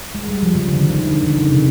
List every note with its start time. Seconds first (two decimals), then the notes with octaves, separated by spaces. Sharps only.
0.15 G#3
0.28 G3
0.43 F3
0.55 C#3
0.69 D3
0.83 D#3
0.96 D3
1.11 D3
1.23 D#3
1.37 C#3
1.50 C3